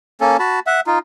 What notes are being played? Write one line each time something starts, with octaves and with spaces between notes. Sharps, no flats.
A#3 C#4 A4
F#4 A5 B5
E5 F#5
D#4 F4